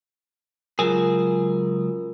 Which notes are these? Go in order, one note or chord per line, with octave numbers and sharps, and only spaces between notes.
C#2 F#3 F4 G#4 A#4